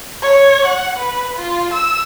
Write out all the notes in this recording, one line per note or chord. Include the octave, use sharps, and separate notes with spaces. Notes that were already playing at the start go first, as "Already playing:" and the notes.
C#5
F#5
B4
F4
E6